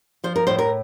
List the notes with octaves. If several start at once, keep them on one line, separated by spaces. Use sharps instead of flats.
F3 C5
A#4
A2 C5
A#4